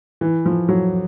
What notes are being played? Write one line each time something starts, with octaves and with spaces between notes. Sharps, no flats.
E3
F3
F#3